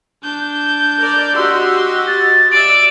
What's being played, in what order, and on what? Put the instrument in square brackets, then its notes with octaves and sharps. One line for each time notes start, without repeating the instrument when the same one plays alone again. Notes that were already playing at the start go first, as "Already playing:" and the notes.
[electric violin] D4 G6
[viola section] A#4 D5
[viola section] F#4 G4 D#5 [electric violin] C6 [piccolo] E6
[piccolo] A6
[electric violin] D5 E5 [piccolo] D7